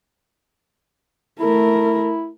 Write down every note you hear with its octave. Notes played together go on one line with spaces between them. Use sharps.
A3 E4 A#4